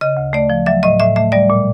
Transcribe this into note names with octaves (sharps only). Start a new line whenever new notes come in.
C#3 D#5
D2
A3 D5
F3
F#3 E5
A2 D#5
A2 E5
A3 E5
G3 D5
A#2